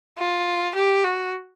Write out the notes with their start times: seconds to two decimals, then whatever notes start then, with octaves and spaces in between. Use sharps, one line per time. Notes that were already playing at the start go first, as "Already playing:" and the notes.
0.18 F4
0.75 G4
1.04 F#4